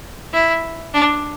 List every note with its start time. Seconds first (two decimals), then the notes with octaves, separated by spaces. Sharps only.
0.33 E4
0.94 D4